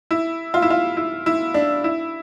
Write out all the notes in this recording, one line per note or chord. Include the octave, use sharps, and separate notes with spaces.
E4
F4
E4
F4
E4
E4
D4
E4